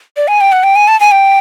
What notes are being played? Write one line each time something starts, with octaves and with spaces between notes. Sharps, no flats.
D5
G#5
G5
F#5
G5
G#5
A5
G#5
G5